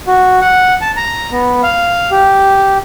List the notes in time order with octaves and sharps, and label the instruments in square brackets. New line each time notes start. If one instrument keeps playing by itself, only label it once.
[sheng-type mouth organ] F#4
F#5
A5
A#5
B3
F5
G4